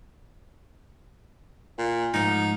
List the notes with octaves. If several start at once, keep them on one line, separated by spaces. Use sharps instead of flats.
A#2
G#2 F3 D#4